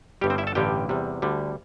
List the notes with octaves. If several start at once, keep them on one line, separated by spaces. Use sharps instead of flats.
G1 G2 G3 G4
C4 C5
E4 E5
A4 A5
A1 G2 D3 G3 G4 G5
E2 C3 G3
D2 D3 G3